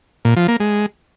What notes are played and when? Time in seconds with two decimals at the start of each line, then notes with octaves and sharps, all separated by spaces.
0.25 A#2
0.36 F3
0.48 A#3
0.60 G#3